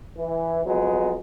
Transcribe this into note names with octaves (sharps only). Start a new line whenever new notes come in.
E3
F2 F#3 G#3 B3